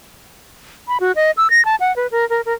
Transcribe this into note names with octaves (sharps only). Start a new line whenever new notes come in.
B5
F#4
D#5
E6
A#6
A5
F#5
B4
A#4
A#4
A#4